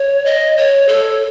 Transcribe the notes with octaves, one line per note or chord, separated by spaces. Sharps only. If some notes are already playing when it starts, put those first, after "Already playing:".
Already playing: C#5
D#5
C#5
A4